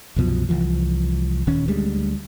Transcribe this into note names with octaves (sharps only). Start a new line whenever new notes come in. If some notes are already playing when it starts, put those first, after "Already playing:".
C2 F#2 B2 F3
C2 E3 F3
D#1 D#3 C#4
D2 G3 G#3